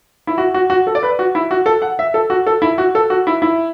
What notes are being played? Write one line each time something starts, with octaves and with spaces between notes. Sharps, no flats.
E4
F#4
F#4
F#4
A4
D5
B4
F#4
E4
F#4
A4
F#5
E5
A4
F#4
A4
E4
F#4
A4
F#4
E4
E4